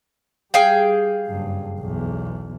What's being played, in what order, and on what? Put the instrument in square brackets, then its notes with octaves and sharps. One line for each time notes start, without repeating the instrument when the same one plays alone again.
[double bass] G3 [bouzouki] G#4 F5 G5
[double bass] F#1 G2
B1 E2